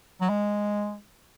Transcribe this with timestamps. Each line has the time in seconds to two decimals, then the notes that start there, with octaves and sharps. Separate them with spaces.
0.21 F#3
0.30 G#3